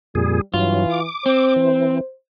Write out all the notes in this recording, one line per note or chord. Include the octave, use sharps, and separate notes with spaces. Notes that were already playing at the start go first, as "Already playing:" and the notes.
F2 A#2 G3 G#4
G2 E3 F#3 F4
D6
C4 C5
E3